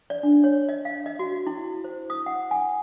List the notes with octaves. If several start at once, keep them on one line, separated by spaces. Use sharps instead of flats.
D5
D4
C#5
D#5
F5
D#5
F#4
E4
C5
D#6
F#5
G#5